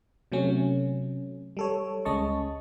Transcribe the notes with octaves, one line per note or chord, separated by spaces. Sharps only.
C3 F#3 A3 C#4
G3 A4 C#5
C#2 G#3 C#4 D#5 A5 C#6